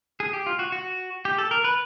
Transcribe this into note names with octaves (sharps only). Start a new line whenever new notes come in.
G#4
G4
F4
F#4
F#4
G4
A4
A#4
B4